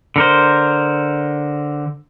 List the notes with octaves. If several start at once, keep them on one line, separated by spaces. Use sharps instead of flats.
D3 A#4 C5